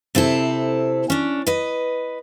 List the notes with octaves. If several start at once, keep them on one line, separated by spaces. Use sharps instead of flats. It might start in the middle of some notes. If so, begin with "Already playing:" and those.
C3 C4 E4 A4
C#4 D4
B4 D#5